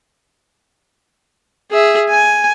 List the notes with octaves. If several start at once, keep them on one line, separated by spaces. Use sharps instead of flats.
G#4 E5
G#5